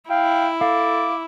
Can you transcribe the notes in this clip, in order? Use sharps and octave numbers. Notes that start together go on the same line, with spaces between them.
E4 F5 G5
A4 F5 D6